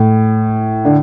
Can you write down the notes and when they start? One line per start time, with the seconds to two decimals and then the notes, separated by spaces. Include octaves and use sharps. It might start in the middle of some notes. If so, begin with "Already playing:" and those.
Already playing: A2
0.85 D3